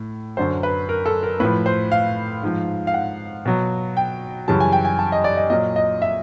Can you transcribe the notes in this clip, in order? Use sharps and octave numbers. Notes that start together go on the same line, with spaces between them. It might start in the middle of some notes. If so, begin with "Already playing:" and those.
Already playing: A2
F#2 D3 F#3 C5
B4
A#4
A4
A#4
A2 F3 B4
C5
F5
G#2 F3
F5
F#5
B2 F#3
G5
F#2 C#3 E3 G3 A5
G#5
G5
G#5
A5
D#5
D5
D#5
A#2 F#3 D#5
D#5
E5